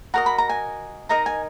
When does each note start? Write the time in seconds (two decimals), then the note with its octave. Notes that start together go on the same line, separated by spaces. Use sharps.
0.14 F#4 A#4 D#5 A#5
0.26 B5
0.38 A#5
0.49 G#5
1.09 D#4 A#4 D#5 A#5
1.26 G#5